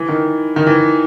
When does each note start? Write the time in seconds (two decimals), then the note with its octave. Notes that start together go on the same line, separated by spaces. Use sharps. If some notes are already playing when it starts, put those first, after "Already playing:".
Already playing: E3
0.09 D#3
0.56 D#3
0.67 E3